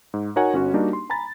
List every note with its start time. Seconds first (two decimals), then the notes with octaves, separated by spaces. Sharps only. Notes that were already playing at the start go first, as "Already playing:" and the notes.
0.14 G#2
0.36 D#4 F#4 A#4 C#5 F#5 G#5
0.53 G1 C#4 F#4
0.74 G3 A#3 D4 D#4 F#4 G4
0.93 C6
1.10 G#5 A#5 B5 A6